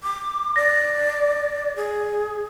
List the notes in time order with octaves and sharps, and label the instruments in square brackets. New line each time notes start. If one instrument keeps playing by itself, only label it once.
[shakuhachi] D6
[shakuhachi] D5 [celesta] A#6
[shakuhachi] G#4